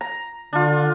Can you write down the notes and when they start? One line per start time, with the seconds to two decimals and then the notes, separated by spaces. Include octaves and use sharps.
0.01 A#5
0.53 D3 D4 F4